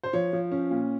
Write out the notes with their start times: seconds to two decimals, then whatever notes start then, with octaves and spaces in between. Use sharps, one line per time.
0.03 C5
0.13 F3 C#5
0.33 F3
0.52 C#4
0.71 A#2